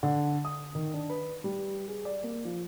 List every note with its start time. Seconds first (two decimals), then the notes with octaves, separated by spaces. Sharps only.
0.03 D3
0.45 D#6
0.75 D#3
0.94 D4
1.10 B4
1.44 G3
1.88 G#4
2.05 D5
2.23 A#3
2.45 F3